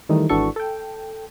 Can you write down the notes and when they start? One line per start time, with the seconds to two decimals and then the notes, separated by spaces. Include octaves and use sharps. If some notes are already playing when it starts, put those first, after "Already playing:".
0.09 D#3 E3 G3 A3 D#4
0.29 G#1 E3 D4 F#4 A4 C#6
0.56 A4 G5